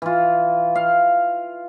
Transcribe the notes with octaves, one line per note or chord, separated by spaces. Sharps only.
E3 F4
F5